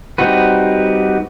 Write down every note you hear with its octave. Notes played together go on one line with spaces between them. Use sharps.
G3 C4 D#4 F#4 B4